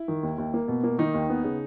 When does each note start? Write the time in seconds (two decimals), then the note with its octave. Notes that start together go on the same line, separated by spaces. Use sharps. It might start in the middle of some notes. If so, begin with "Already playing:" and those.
Already playing: E4
0.08 D#3
0.23 D#2
0.38 D#2
0.54 A#3
0.68 B2
0.83 A#3
0.98 D#3 D#4
1.14 D#2
1.30 B3
1.44 C#3